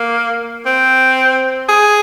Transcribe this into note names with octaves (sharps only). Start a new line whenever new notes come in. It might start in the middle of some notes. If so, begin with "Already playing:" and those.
Already playing: A#3
C4
G#4